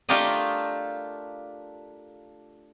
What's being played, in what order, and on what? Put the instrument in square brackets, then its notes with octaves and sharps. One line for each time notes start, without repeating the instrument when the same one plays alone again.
[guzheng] A3 D4 F4 G4 A#4 D#5